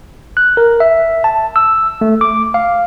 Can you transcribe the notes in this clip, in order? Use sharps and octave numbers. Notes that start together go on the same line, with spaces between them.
F#6
A#4
E5
A5
E6
A3
D6
F5